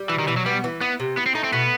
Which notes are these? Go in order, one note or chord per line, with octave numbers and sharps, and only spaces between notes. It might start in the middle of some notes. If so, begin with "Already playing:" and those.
Already playing: G3
B2 E3
D#3
B2 E3
F#3
G3 B3
E3
B3 E4
C3
B3 E4
C4
A3 D#4
C4
B2 B3